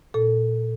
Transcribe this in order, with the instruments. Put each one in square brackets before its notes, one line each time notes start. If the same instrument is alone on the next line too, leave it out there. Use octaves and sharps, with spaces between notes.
[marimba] A#2 A4